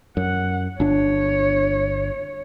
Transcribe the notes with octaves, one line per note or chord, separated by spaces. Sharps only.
F#2 F#5
G1 D4 C#5